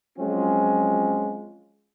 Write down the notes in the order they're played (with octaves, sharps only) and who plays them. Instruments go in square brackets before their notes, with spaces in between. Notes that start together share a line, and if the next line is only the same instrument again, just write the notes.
[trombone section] F3 F#3 G#3 C4 C#4 F4